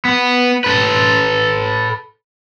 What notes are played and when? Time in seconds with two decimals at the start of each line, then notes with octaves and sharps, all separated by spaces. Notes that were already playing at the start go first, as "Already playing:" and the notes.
0.05 B3
0.64 A4 B4